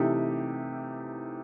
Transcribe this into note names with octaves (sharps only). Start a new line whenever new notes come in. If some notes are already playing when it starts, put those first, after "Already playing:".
Already playing: C3 E3 A3 D#4 G4